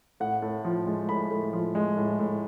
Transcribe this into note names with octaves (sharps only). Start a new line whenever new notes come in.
A2 F#5
A2
F3
G#3
A2 B5
A2
F3
G#3
A2
A2